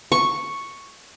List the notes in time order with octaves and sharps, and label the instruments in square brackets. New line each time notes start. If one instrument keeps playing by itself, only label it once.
[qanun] C#6